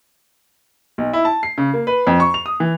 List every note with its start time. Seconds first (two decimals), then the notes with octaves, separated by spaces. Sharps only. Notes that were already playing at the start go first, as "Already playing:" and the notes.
0.98 B1
1.13 E4
1.25 A5
1.43 C7
1.58 C#3
1.74 A#3
1.87 B4
2.07 F2
2.20 C#6
2.34 F7
2.46 D#6
2.60 E3